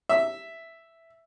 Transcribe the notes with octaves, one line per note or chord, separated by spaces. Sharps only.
E5